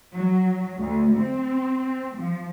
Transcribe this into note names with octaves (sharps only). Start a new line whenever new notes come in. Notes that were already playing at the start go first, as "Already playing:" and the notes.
F#3
D2
C4
F3